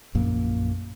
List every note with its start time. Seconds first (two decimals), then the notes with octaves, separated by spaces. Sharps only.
0.15 A#1 F#2 A#2 A#3